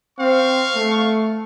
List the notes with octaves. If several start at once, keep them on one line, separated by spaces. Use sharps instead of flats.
C4 F5 C#6
A3